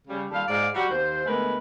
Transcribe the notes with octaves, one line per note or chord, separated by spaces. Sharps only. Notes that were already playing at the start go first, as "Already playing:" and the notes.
C#3 G3
D#2 G3 A4 F5
G#2 D5 F5
G3 F#4
D#2 C5
D2 G#3 A3 B3 A#4 B4